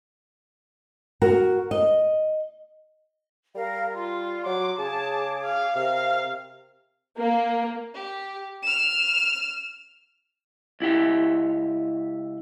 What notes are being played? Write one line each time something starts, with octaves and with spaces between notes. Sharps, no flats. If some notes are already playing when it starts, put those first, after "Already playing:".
F#4 A#4
D#5
G3 A#4 F5
F4 C6
F#3 D6
C#3 G#4 A5 D6
F5
C3 A#4 F5
A#3
G4
F6 E7
C#2 E4 G4 G5